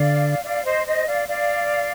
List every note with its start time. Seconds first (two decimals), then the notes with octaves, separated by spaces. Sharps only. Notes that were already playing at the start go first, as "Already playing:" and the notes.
Already playing: D3 D5 F5
0.44 D5 F5
0.65 C5 D#5
0.86 C5 D#5
1.07 D5 F5
1.28 D5 F5